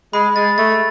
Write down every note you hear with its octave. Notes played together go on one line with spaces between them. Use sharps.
G#3 B5
G#3 A6
A3 A6